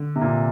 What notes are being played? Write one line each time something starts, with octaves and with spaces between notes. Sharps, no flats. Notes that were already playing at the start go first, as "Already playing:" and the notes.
Already playing: D3
C3
A#2